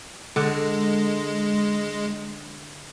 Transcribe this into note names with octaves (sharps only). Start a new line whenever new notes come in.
D3 G#3